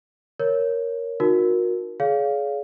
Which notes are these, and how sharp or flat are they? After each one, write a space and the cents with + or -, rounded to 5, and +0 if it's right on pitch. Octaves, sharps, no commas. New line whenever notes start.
A#4 +5 C#5 +0
D#4 +0 F#4 -30 A#4 +10
G#4 +25 C#5 +40 F5 +0